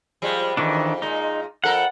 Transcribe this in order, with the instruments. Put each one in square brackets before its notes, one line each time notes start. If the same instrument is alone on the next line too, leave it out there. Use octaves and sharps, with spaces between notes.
[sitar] F3 G3 G#3
[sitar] F2 [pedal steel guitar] D#3 E3 D4
[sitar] A#2 G#3 [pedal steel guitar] D#4
[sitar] F2 A4 A#4 [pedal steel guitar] F#5